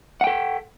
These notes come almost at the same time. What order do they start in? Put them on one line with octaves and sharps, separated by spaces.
F#5 G5 A4